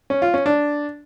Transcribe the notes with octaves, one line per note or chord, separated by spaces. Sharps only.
C#4
F4
C#4
D4